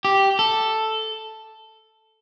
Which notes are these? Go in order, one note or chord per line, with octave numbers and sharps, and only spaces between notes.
G4
A4